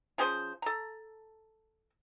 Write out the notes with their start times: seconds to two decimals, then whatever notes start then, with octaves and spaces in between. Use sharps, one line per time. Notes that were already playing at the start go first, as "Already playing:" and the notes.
0.18 F3 C#4 G#4 C5
0.62 A4 A#5